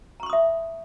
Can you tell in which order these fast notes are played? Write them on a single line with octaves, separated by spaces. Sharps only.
A#5 C#6 C6 D#6 E5